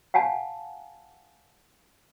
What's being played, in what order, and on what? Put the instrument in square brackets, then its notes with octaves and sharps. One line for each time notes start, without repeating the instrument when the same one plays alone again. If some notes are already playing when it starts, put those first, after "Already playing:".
[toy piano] F5 F#5 G#5 A5